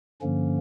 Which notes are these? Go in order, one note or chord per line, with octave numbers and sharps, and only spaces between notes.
G2 D3 F3 A#3 C#4